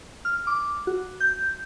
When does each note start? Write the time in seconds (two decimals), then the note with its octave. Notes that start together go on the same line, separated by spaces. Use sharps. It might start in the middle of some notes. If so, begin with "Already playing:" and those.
0.25 F6
0.47 D6
0.87 F#4
1.20 G6